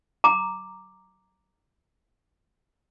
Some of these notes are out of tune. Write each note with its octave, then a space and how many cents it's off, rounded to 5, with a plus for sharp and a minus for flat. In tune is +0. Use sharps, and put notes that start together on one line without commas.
A#5 -5 D6 +5